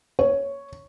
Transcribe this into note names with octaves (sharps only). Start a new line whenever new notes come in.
C#5